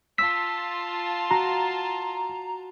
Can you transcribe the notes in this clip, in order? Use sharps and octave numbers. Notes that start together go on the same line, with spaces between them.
F4 A5 C6 E6 B6
F#4 A#5